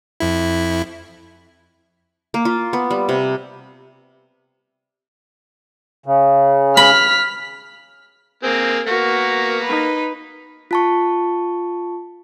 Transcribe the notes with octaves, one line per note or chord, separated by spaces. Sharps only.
F2 E4
A#3
F4
B3
G3
C3
C#3
B5 F6 B6
A#3 C4 G#4
A#3 B3 F#4 A#4
D#4 B4
F4 A5 C#6